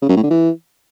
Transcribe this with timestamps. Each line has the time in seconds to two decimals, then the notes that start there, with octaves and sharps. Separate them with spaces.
0.02 C#3
0.09 F#2
0.16 A2
0.23 D3
0.30 E3